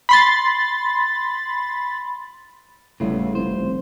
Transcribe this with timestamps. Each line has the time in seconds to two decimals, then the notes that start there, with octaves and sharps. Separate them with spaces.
0.09 B5 C6 A6
3.00 G#1 A2 C#3 G3 B3 F4
3.35 F1 C5